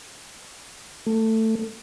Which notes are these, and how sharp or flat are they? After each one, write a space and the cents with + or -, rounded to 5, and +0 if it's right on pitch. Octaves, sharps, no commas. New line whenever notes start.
A3 +15